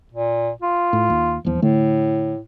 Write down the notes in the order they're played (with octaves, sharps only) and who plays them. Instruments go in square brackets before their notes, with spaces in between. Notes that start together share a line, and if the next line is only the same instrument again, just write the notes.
[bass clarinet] A#2
F4
[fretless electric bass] A2
D#2
[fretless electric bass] D#1 E2 [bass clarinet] F3
[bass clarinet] A2 [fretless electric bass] D3 A3